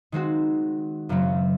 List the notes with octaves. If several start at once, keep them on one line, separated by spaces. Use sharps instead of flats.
D#3 G#3 C4 F#4
F#2 C#3 F#3 C4